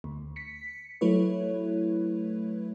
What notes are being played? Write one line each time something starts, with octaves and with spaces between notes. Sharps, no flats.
D2
B6 C#7
F#3 A3 E4 B4 C#5